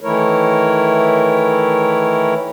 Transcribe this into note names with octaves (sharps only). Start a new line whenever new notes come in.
D#3 E3 A3 E4 A#4 C#5